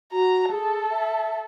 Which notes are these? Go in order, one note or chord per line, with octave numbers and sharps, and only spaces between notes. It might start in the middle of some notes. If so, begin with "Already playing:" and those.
F#4 A#5
G#4 A4
E5